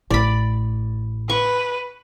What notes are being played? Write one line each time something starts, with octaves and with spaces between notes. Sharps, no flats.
A1 A2 D5 B5
B4 C#6